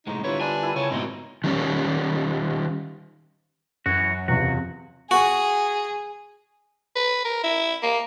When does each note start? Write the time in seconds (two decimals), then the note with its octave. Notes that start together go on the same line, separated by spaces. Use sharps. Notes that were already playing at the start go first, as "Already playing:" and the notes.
0.07 C2 A2 G#3 D#4 C5 A#5 C#6
0.24 D3 G3 E4 F4 B4 C#5
0.41 D4 G#5
0.63 E4 A#4 G5
0.76 C#3 C#5 G#5 A5
0.91 G#2 B2 C4 D#4 F#4
1.44 D#3 G3 C#4
3.86 F#2 E3 F#4
4.28 E2 C3 F3 F#4
5.11 F#4 G#4
6.96 B4
7.25 A#4
7.44 E4
7.83 A#3